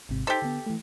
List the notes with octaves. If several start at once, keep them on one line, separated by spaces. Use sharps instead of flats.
G#1 G#2 C3
D#4 G4 A4 C5 C6
D3 B3
E3 A3